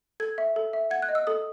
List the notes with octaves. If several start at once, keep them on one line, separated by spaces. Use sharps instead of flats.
A4 G#6
E5
A4
E5
F#5 G#6
F#6
D#5
E6
A4 D#6